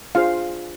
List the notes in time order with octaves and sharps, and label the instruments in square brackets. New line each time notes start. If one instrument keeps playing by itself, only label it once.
[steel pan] D4 F4 G#4 C5 F5